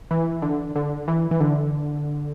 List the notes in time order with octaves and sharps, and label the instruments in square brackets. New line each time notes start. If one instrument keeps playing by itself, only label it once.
[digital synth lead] E3
D3
D3
E3
E3
D3